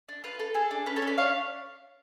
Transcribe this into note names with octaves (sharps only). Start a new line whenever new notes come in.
D4
F4 B4
A4
G#4 A4
D4
C#4 B4
A4 C#5
C#4
B4 D5
D4 C#5 F5